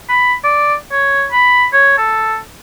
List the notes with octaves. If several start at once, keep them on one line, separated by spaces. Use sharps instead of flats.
B5
D5
C#5
B5
C#5
A4